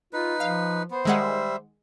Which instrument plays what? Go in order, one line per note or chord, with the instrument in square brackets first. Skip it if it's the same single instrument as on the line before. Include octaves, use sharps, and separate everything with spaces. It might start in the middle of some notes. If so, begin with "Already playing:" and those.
[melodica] D#4 B4 [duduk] F4
[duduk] F3 [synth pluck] F5
[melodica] B3 [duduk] C5
[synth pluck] D#3 G#3 F#5 [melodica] G3 E5